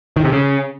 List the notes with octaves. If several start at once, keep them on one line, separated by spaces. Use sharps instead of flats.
D#3
C3
C#3